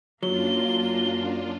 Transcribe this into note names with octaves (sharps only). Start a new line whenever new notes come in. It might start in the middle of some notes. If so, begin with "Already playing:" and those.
F#2 F#3 A#3 D4 F4 G7